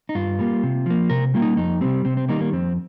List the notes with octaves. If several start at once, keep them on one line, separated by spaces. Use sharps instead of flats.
D#4
G2 F4
G3 A#3
C3
F3 A#3
C3 A#4
G3 A#3 F4
D#4
F2 D#4
C3 G3 C4
C3 C4
C4
D#3 G3 A#3 D#4
A#3
F2 C4